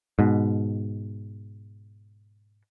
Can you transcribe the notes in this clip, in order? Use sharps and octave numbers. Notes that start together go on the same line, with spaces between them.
G#2 B2